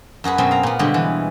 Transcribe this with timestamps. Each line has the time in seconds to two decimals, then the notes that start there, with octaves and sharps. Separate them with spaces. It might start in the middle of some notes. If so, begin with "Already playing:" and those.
0.24 F#2 F#4 G#4 B4
0.38 F#2 B2 C4
0.51 F5 A#5
0.63 A#2 B3
0.79 B2 D3 G3 G#3
0.94 E3